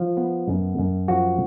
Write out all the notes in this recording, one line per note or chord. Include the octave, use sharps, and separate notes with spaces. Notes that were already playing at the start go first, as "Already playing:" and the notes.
Already playing: F3
B3
F#2
F#2
F3 F#4